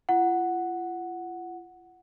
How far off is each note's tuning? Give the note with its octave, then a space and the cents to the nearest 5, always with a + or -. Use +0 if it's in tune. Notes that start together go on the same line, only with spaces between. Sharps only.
F4 -40 F#5 +0